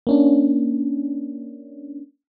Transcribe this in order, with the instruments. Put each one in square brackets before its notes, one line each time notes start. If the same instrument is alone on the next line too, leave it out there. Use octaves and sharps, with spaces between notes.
[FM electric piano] A#3 C#4 D4